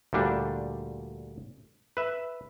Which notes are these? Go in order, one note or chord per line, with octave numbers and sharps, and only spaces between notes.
D2 A#2 G3 D4
B4 E5